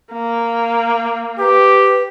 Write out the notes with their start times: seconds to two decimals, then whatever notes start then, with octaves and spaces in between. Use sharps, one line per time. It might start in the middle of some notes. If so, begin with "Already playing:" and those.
0.12 A#3
1.39 G4 B4